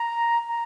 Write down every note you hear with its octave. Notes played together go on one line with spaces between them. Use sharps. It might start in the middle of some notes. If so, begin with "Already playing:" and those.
Already playing: A#5
A#5